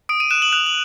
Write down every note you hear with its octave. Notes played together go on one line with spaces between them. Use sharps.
D#6 D7
D#7
F#6 E7
F#7
F#6 F7
F#7